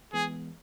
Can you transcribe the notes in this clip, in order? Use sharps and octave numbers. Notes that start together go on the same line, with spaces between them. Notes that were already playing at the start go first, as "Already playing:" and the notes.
E3 G#3 B3 G#4